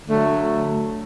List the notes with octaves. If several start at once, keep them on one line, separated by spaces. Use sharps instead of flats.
D3 F#3 A3